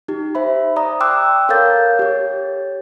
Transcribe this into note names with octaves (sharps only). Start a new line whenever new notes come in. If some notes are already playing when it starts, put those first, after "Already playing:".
D#4 G4
C5 E5 B5
D5 A#5 D#6
G5 C6 D6 E6 F#6
A4 A#4 C#5 F5 G6 A6
G4 C#5